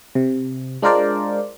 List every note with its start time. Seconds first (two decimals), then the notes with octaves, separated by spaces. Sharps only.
0.15 C3
0.82 G#3 D4 F4 A#4 C5 D5